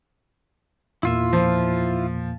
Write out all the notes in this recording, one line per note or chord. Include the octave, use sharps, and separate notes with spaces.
E2 A#2 A#3 E4 F4 E5
F3